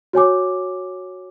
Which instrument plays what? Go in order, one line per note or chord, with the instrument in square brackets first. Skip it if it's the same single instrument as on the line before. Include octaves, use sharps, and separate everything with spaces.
[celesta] F#4 C#5 G#5 D6